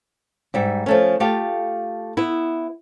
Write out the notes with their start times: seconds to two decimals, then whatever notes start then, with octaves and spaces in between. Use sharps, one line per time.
0.54 G#2 G3 E5
0.86 F3 A3 C#4
1.20 A3 F4 G4 F5
2.17 B3 E4